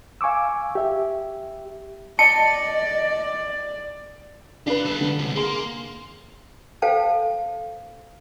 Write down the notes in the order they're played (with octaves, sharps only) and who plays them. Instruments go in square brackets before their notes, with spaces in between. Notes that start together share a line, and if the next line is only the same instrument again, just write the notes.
[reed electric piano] F5 G#5 C#6 D6 E6
G4 E5
[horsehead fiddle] D5 [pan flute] D#5 [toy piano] A5 [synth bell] C#7
[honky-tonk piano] D4 B4 [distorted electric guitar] G4 F5
[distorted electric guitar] G3 A4
[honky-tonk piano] D3
[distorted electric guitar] C#2 C3
[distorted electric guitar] A#3 [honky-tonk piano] G#4 C6
[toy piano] A4 C5 F5 G5 A5